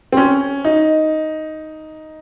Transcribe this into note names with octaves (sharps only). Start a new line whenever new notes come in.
C4
C#4
D#4